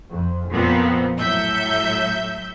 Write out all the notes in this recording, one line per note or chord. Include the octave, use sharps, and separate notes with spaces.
F2
F2 A#2 F3 B3 C4
A2 F#3 E5 G6